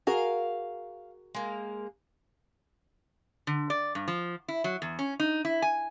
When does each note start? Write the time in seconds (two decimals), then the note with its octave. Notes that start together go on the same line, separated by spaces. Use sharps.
0.07 F#4 G#4 A#4 F5
1.35 G#3 A#3
3.47 D3
3.70 D5
3.95 G2
4.08 F3
4.48 E4
4.64 F#3
4.82 E2
4.99 C#4
5.20 D#4
5.45 E4
5.62 G#5